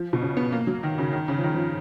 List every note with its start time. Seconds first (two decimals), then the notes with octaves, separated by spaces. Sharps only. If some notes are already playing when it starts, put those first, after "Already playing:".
Already playing: F3
0.13 B2
0.22 C#3
0.37 B3
0.52 A#3
0.67 F#3
0.83 D#3
0.98 C#3
1.13 D#3
1.28 C#3
1.38 F3
1.44 D#3
1.54 F3